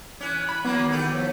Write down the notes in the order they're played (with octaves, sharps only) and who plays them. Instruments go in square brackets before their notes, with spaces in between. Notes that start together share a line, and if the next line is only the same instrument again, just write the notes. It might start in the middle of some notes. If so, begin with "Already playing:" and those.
[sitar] E3 C#4 [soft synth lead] F#6
[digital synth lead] B5
[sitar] E3 F#3 A#3 [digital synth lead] B3
[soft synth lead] D#3
[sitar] A3 G4
[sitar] F3 [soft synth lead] C#5